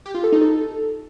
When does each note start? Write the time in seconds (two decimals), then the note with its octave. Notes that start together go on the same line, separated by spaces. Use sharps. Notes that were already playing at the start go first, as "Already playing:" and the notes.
0.06 G4
0.15 F4
0.24 A4
0.32 D#4
0.41 A4